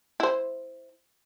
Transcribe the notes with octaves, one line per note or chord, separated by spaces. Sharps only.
E4 C5